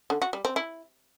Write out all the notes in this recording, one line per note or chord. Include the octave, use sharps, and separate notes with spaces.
D3
F#4
G3
C4
E4